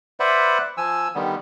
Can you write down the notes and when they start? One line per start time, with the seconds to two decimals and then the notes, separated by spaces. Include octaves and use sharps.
0.20 B4 C5 D5 E5 F#5 B5
0.77 F3 G#5 E6
1.15 D3 D#3 G3 B3